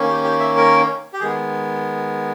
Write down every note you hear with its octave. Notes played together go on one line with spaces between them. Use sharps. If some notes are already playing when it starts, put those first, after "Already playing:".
Already playing: D#3 A#3 C#4
G4
G4
E5
A#4
G4
D#3 G#3 B3 G#4